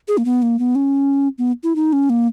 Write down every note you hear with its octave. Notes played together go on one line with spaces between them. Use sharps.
G#4
A#3
B3
A#3
B3
C#4
B3
E4
D#4
C#4
A#3